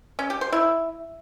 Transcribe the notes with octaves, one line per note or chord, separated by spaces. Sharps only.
C#4
G4
C5
E4